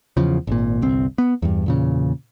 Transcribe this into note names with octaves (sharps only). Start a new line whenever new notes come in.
E2 C#3 F3
G#1 A#2
G1 C2 C4
B3
E2 G2
E2 A#2 C#3